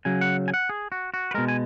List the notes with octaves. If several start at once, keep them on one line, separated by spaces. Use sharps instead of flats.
C#3 F#3 G#5
F#5
G#5
F#5
G#4
F#4
F#4
B4
B2 G#3 A#4
G#5